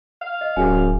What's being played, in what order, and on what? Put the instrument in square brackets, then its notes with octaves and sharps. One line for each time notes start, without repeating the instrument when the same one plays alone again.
[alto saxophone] F5
[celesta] D#5
[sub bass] D1 [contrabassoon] F#2 [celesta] G#4 G#5